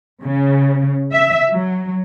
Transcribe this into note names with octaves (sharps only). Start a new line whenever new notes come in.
C#3
E5
F#3